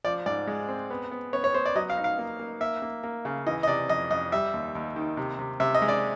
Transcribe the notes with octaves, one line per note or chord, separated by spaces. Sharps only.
F3 D5
G#2 D5
G#3
C4
B3
B3
B3 C#5
C#5
B3 C5
D5
F#3 D#5
F5
D#4
F5
A#3
A#3
A#3 E5
A#3
A#3
C#3
E3 D#5
D#5
C3 D5
F2 D#5
F2 D#5
G3 E5
D#2
D#2
D#3
C3
C3
C3 E5
D#5
G#3
D5